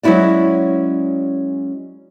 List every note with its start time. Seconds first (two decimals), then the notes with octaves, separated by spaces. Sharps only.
0.03 F#3 G#3 C#4 E4 F#4 D5